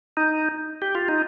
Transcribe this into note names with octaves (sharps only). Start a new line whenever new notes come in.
D#4
G4
F4
D#4